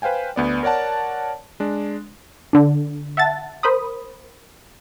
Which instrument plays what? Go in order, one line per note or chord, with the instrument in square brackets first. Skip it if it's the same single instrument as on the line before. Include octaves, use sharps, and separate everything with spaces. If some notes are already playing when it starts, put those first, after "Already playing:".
[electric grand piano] B4 C5 F5 G5 G#5
D2 B3 D5
A#4 C#5 D5 F#5 A5
G#3 D4
[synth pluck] D3 D4
E5 F#5 A5 A6
A#4 C5 B5 D#6